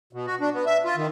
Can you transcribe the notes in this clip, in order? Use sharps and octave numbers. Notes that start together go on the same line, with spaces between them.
B2
F#4
D4
B3
E5
F4
D#3